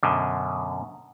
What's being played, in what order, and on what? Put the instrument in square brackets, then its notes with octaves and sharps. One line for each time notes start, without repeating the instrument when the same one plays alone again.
[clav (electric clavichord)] F#2 B2 D3